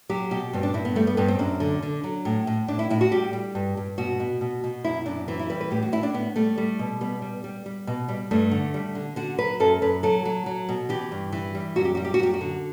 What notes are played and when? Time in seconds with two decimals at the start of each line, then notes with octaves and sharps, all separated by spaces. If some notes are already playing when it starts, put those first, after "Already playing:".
0.09 F#3 G4
0.31 B2 G4
0.53 G2 C4
0.63 D4
0.74 G2 E4
0.85 B3
0.95 G3 A3
1.07 B3
1.17 G2 B3
1.28 C4
1.39 F#2 D4
1.60 D3
1.82 D3
2.04 F#3
2.25 A2
2.47 A2
2.68 A2 D4
2.79 E4
2.90 A2 E4
3.01 F#4
3.12 G3 G4
3.33 G3
3.55 G2
3.77 G2
3.98 B2 F#4
4.20 B2
4.41 B2
4.64 B2
4.84 F#2 E4
5.06 F#2 D4
5.28 E3 C4
5.39 E4
5.50 G3 B4
5.61 B4
5.71 A2 G4
5.83 F#4
5.92 A2 E4
6.03 D4
6.14 A2 B3
6.36 G3 A3
6.58 G3
6.79 B2
7.01 G3 B3
7.22 G3
7.44 G3
7.66 G3
7.87 B2
8.08 G3
8.31 G2 A3
8.51 D3
8.74 G3
8.95 D3
9.16 D3 F#4
9.38 F#3 B4
9.60 F#2 A4
9.82 F#2 B4
10.03 F#3 A4
10.25 F#3
10.46 F#3
10.69 B2
10.89 E3 G4
11.12 G2
11.32 E3
11.55 G3
11.76 F#2 F#4
11.85 G4
11.95 G3 F#4
12.05 G4
12.14 F#4
12.20 F#2 G4
12.34 F#4
12.41 D3